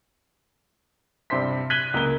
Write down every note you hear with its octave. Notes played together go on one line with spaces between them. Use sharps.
G2 C3 C5 C6 B6
F#6 G#6 B6 D#7 F#7 G7
C#2 A#3 A#4 G7